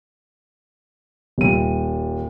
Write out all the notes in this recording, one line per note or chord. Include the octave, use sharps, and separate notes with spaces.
D#1 D#7